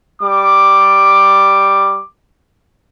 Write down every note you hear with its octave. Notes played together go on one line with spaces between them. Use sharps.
G3 D6